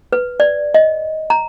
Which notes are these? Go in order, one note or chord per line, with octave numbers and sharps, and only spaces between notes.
B4
D5
D#5
A#5